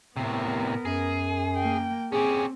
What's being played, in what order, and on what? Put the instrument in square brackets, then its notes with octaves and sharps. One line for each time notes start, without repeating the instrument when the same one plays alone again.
[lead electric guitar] A2 C3 [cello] B3 A#4
[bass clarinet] F#2 [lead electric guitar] G#4
[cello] A#3 G5
[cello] C4 [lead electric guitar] C#4 G4 [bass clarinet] G#4